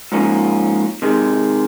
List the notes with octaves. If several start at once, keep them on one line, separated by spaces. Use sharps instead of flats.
G#2 F3 A#3 C#4
C3 D#3 G#3